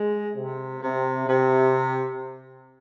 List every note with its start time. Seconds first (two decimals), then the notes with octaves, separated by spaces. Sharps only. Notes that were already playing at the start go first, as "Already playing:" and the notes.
Already playing: G#3
0.35 C3
0.81 C3
1.27 C3